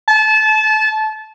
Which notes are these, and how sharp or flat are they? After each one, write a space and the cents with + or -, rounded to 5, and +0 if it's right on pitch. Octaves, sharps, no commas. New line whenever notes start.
A5 -25